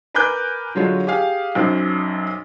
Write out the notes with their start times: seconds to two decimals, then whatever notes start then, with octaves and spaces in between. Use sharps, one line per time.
0.14 A#4 B4 G#5 D6 F#6 G6
0.75 D3 F#3 G#3 F4 C#5
1.07 G4 G#4 F5
1.55 B1 F#2 C5